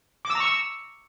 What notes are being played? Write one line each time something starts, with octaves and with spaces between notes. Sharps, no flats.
D6
E6
A#5
C#6
E6